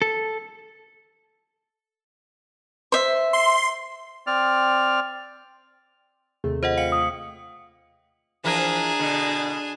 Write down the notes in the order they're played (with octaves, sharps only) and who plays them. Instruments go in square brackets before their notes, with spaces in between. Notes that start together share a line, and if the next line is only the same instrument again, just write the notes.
[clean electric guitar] A4
[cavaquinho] C5 E5
[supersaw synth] C6
[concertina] C4 D5 F6
[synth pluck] D#2 C3 A3 [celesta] G#4
[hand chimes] F4 [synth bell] C5 D#5 F#5
[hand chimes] F5 G5 [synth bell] C#7 F#7
[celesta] D#6
[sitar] E3 F3 A#4 [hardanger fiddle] D4 G#4
[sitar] B2 D3